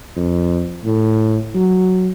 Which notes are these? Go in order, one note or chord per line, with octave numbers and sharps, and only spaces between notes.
F2
A2
F#3